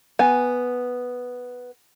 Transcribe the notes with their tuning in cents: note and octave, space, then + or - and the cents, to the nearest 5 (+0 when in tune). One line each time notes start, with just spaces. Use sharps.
B3 +0 G#5 +0